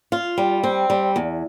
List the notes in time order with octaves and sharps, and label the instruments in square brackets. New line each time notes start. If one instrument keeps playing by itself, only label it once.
[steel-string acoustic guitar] F4
G3
C4
G3
E2